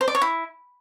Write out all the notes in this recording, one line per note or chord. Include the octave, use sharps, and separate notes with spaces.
C5
D5
C#5
E4